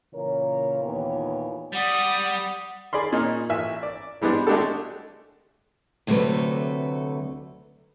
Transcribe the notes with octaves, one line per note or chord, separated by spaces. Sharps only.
A#2 C#3 E3 A#4 C#5
D#2 A#2 E3 B3 C#5
G3 D5 F#5 D#6
G#4 D5 B5 C6
A#2 C#4 D#4
A1 E5 G#5
D5
E3 G3 G#3 B3 D4
G#3 A3 D4 F#4 G4 A4
D2 C3 F#3 A3 B4